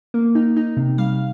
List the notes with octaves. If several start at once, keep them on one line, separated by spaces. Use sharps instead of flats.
A#3
D#4
D#4
C3
G3 F5